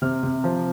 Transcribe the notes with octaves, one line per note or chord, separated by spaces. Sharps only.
C3 F6
C3
F3